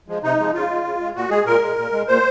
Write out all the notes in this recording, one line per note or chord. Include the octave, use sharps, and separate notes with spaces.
F3 G#3
C3 D#4
F3 G#3
C#3 F4
G#3
C#3
G#3
A#2 F#4
G#3 G#4
A#2 A#4
G#3
A#2
G#3
A#2 C5